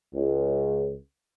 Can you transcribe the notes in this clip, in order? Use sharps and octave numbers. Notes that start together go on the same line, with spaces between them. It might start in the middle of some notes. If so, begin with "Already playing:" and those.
C#2